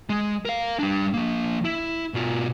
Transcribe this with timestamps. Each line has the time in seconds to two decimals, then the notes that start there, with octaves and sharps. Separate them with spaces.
0.09 G#3
0.45 A#4 F5
0.79 G3 D4
1.14 F3 A#3
1.65 E4
2.14 B2 F4